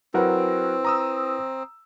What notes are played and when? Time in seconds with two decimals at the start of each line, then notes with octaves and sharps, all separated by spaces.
0.14 F#3 C4 E4 A#4 B4 F#5
0.85 A#5 D#6 E6